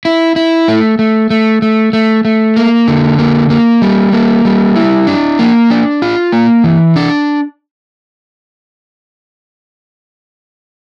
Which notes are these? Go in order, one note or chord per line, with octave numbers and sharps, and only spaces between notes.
E4
E4
A3
A3
A3
A3
A3
A3
A#3
D3
A#3
A#3
G3
A#3
G3
E4
D4
A#3
D4
F4
A#3
E3
D4